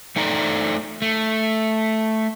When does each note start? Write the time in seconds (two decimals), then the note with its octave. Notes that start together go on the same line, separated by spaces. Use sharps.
0.16 A3 D#4 A4 D5 A#5
1.02 A3